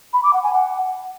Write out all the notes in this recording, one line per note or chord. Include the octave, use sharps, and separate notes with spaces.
B5
D6
F#5
G#5
F#5